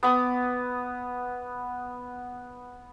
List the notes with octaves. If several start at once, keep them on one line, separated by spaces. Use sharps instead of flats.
B3 D6 D#6